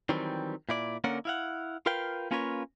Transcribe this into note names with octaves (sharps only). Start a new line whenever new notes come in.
D#3 E3 F#3 G3 C4
A#2 E4 D5
D3 A#3 C#4 A#4 D5 F#5
E4 F5 F#5
F4 A#4 B4 F5 G5
A#3 C#4 F4 A#4 B4 C#5